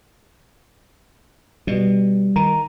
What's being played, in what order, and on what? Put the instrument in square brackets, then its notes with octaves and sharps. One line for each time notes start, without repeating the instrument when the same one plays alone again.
[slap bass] B2 [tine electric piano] G3
[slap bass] D#3 [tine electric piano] A#5